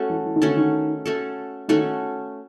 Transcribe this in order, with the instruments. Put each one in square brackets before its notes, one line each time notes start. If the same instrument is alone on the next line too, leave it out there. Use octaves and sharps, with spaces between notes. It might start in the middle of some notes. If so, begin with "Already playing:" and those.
Already playing: [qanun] A3 C#4 F#4 A4
[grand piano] E3
E3
D#3
[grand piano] D3 [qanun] A3 C#4 F#4 A4
[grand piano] D#3
[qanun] A3 C#4 F#4 A4
[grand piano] D#3 [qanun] A3 C#4 F#4 A4